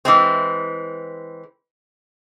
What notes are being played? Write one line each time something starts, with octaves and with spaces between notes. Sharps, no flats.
E3 G#3 C4